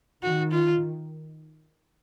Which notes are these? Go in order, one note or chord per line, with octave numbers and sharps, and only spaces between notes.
D#3 F#4
F4